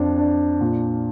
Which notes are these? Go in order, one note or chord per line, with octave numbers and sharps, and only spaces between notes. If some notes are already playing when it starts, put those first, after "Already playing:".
Already playing: F2 D4
D4
A#2